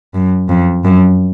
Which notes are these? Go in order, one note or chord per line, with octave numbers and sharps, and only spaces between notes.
F#2
F2
F#2